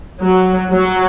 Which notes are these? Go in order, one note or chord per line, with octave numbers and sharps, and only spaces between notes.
F#3
F#3